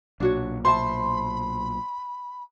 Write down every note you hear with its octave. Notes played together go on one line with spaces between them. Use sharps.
B1 A#2 D4 F#4 C#5
C5 E5 A5 B5 C6